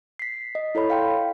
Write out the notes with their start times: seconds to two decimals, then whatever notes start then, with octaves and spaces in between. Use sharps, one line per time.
0.19 B6 C7
0.55 D#5
0.75 E4 A4 C#5 B5
0.90 F5 G5 C6